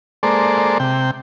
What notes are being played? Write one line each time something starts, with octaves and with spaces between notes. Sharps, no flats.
G#3 A#3 A4 C5 D5
C3 G5